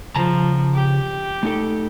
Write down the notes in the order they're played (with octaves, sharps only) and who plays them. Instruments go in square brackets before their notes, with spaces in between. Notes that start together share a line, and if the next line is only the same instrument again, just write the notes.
[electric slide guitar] C#3 A5 A#5 [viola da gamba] F3
[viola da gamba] G4
[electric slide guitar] A3 D#4 A4